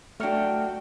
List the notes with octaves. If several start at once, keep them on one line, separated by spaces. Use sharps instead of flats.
F#3 A3 D4 F#4 G5 F6 C#7